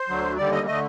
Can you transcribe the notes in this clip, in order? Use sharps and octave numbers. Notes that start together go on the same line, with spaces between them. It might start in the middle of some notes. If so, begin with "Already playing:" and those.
Already playing: C5
D2 D3 F#3
D#2 D3 G3 D5
D#5
D3 A3 D#5